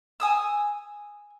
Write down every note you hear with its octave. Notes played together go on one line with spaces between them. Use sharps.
G#5 D#6 E6